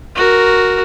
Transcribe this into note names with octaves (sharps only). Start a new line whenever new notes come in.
F#4 A#4